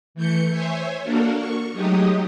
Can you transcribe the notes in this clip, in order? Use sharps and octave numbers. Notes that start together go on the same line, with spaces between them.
E3 A3 G6 C#7
C5 C#5 E5 G#5
A#3 D4 F#4 A4 A#4
C#6
F#3 G#3 A3 D#4 G4 D#5